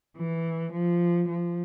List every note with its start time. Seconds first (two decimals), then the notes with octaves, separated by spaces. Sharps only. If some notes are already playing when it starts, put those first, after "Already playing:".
0.18 E3
0.73 F3
1.29 F3